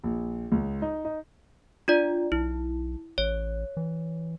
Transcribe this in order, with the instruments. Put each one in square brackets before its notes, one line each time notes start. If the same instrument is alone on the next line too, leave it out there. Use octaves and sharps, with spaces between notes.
[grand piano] A#1
C#2
D#4
D#4
[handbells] D4 F4 D5
[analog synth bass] B1 [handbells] E4
[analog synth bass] A1 [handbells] C#5
[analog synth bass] E3